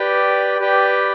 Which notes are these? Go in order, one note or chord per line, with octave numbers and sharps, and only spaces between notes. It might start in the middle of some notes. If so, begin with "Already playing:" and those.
Already playing: G4 B4 D5 G5
G4 B4 D5 G5